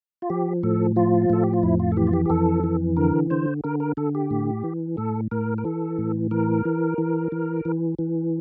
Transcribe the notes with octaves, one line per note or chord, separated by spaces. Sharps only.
F4
F3 G4
A2 A4
F3 F4
A2 A4
G4
F4
F2 E4
F4
A4
E3 G4
F4
G4
G4
F2 A4
E3
D3 A#4
D3 C5
D3 A#4
A#4
D3 A4
G4
A2
E3
A2 A4
A2 A#4
A#4
E3 A4
A2
E3 A#4
E3
E3
E3
E3
E3